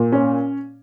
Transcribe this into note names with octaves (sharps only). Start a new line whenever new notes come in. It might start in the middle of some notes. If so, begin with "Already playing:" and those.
Already playing: A#2
C#4